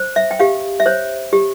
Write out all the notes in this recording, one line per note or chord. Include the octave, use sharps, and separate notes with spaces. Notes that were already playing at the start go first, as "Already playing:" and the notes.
Already playing: C5
E5
G5
G4 F5
E5
C5 C#5
G4